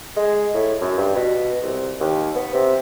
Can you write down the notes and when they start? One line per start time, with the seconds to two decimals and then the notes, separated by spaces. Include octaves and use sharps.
0.16 G#3
0.54 A2
0.81 F#2
0.98 G2
1.16 B2
1.62 C2
2.00 D#2
2.35 B3
2.54 C3